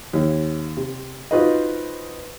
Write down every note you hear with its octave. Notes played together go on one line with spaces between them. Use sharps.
D#2
C3
D#4 F4 F#4 B4 C5 D#5